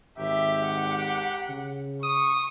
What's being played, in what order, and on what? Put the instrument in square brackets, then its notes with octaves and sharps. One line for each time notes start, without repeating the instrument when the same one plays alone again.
[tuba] G#1 [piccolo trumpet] G4 [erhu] E5
[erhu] F#5
[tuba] C#3
[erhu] C#6 [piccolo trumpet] D#6